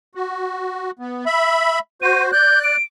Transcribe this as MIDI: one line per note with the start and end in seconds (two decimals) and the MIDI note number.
0.15 0.91 66
0.99 1.25 59
1.26 1.79 76
1.26 1.79 83
2.02 2.31 66
2.02 2.31 72
2.02 2.23 99
2.32 2.76 74
2.32 2.76 90
2.32 2.59 91
2.64 2.83 98